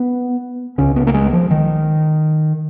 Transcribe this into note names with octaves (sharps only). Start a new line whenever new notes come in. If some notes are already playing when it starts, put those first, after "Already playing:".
Already playing: B3
C#2 C#3 C#4
B3
A#3
G#3
F3
D#3